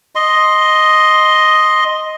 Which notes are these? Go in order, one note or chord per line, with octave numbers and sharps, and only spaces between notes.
D#5 C6